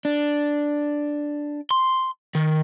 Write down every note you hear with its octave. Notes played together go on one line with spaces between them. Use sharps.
D4
C6
D#3